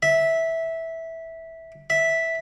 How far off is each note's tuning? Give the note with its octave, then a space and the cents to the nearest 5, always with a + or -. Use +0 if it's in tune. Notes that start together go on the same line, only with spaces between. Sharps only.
E5 -10
E5 -5